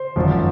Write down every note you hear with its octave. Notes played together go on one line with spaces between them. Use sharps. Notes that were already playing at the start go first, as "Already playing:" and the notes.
Already playing: C5
G#1 F#2 F3